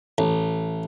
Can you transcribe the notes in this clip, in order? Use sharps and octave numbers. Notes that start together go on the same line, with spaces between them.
A1